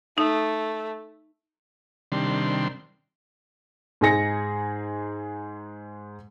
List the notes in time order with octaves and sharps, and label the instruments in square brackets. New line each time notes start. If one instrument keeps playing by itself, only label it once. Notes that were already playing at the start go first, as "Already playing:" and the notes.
[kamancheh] A3 [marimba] D#4
[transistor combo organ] C3 D#3 G3 D4 C6
[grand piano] G#2 D#4 G#4 G#5 A#6 C#7